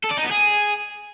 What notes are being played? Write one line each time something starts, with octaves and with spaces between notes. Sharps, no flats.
A4
D5
D#4
B3
G#4